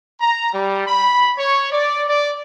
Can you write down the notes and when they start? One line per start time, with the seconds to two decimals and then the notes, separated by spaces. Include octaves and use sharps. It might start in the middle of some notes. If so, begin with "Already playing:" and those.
0.20 A#5
0.53 G3
0.87 B5
1.38 C#5
1.71 D5
2.07 D5